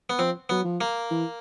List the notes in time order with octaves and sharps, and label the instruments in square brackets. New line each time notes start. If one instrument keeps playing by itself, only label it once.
[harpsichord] B3
[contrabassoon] F3 [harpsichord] C4
[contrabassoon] F#3 [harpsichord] B3
[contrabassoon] F3
[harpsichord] A#3
[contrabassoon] E3